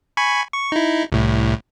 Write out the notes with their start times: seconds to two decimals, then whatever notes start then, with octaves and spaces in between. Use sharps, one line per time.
0.17 G#5 B5 C#6
0.53 C#6
0.72 D#4 E4
1.12 C2 A2